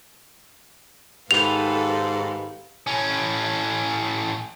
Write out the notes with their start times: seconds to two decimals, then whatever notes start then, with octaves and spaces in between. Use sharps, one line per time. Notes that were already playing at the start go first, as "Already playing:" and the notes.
1.31 G#2 D#3 B3 G4 A4 B4 F5 F7
2.87 A2 C#4